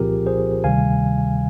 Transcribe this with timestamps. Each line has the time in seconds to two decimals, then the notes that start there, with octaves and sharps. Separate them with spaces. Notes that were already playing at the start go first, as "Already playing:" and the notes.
Already playing: C2 A#2 F3 C4 F4 G4 G#4 A#4
0.27 G#4 C5
0.64 D2 C3 D#3 G3 F5 G#5